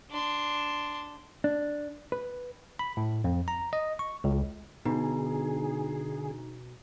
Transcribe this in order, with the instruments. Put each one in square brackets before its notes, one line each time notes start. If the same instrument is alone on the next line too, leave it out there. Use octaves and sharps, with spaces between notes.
[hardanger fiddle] D4 C6
[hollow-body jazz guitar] D4
B4
[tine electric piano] B5
A2
F2
A#5
D#5
C#6
C#2
[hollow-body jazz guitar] B2 [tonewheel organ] D3 G#4 [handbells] D#4